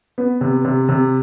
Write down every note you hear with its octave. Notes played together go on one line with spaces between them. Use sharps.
B3
C3
C3
C3